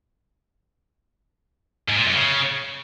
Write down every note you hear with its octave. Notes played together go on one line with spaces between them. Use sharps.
G#2
A#2
F#2
C#3